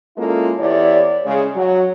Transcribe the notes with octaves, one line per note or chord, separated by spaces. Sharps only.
G#3 A#3 C#4 E4 F4 A4
E2 E4 G4 C#5 D5
C#3 G#3
F#3